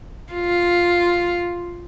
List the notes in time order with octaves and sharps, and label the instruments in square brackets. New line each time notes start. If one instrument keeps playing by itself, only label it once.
[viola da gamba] F4